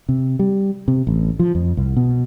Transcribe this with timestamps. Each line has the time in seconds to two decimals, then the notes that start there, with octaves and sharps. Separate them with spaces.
0.09 C3
0.39 G3
0.88 C3
1.07 A1
1.39 F3
1.55 F2
1.77 C2
1.97 B2